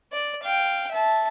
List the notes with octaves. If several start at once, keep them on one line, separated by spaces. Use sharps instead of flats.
D5
F5 G5
E5 A5